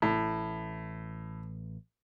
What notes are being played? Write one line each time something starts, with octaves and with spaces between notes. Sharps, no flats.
A1 A2